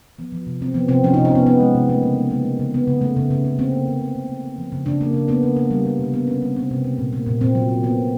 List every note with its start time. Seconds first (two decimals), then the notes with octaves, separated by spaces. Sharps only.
0.19 F3 B3
0.32 F3
0.47 C3
0.61 C3 C4
0.74 F3 B3
0.88 C3 C4
1.03 F3 C#4
1.14 C3 D#4
1.25 C#4
1.32 C3 B3
1.46 C3 B3
1.60 G#3
1.75 C3
1.89 A3 A#3
2.03 C#3
2.17 A3
2.31 C#3 A#3
2.45 A3
2.59 C#3
2.74 C#3 B3
2.88 C#3
3.01 A3
3.16 C#3
3.31 C#3
3.45 C#3
3.59 A#3 C4
3.72 A#3
3.87 C#3
4.01 C#3
4.16 C#3
4.29 C#3
4.44 A#3
4.58 F3
4.72 C#3
4.86 C#3 D4
5.01 A#3
5.14 C#3
5.28 A#3 B3
5.43 A#3
5.56 A#3
5.71 G3
5.85 G3
5.99 C3
6.14 C3 B3
6.27 C3 C#4
6.42 G3 C4
6.56 C3 C4
6.71 C3
6.84 A#3
6.98 A#2
7.13 A#3
7.26 A#2
7.41 A#2 C4
7.55 F#3
7.69 A#3
7.83 A#3 B3
7.98 A#2